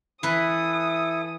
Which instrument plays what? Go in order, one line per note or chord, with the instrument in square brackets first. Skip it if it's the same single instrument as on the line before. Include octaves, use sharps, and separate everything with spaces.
[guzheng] E3 B4 [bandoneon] E4 A4 [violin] D#6